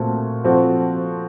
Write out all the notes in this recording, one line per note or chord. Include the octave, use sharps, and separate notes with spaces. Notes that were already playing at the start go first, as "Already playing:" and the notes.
Already playing: A#2 A3 C4 F#4
F3 C4 F#4 A4